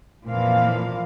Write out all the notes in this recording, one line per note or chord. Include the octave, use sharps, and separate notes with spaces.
F2 A#2 E3 F3 A#3 F5